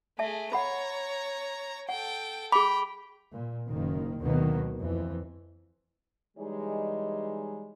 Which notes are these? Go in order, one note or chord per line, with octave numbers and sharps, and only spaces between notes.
A3 G#4 E5 A5
C#5 F#5 A#5 B5
A4 F#5 G5
G#4 G5 B5 D6
A#2
F#1 D#3 A#3
D2 B2 D#3 F#3 A#3 B3
F2 E3
E3 G3 G#3 D#4 G#4 C#5